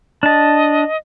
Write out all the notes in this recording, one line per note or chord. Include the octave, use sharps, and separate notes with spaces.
D4 D#5 A5